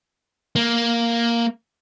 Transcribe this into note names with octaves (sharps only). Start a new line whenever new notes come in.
A#3